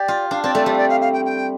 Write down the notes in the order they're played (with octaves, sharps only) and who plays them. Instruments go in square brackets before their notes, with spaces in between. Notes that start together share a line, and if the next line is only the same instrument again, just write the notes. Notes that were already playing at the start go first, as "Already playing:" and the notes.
Already playing: [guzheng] G4 [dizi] D5
[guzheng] F4
[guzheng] D4 [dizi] F5
[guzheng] C4 [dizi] D5
[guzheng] A3 [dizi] D5
[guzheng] G3 [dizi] D5
[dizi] F5
D5
F5
F5
G5
G5